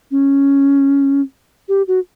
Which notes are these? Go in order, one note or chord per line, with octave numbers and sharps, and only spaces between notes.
C#4
G4
F#4